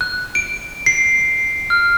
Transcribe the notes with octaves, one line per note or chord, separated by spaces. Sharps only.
F#6
D7
C7
F6